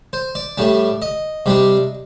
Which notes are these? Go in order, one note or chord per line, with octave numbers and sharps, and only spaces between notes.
C5
D5
A2 G3 D4
D#5
C3 G3 D4